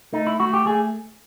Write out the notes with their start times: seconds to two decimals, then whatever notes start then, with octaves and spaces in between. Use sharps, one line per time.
0.13 A3 D#4
0.27 E4
0.40 A3 F#4
0.54 G4
0.66 A3 G#4